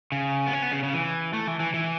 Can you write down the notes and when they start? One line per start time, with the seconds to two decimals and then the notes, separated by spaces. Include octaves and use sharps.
0.12 C#3
0.47 B3
0.53 C#4
0.62 B3
0.72 C#3
0.83 C#3
0.94 E3
1.33 A3
1.47 E3
1.60 E3
1.74 E3